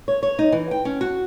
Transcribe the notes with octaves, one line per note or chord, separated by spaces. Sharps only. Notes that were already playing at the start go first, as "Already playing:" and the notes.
C#5
C#5
D#4
E3
G5
C#4
F#4